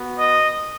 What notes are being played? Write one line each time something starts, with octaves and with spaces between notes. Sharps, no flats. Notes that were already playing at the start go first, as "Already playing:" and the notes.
Already playing: B3 F#4
D#5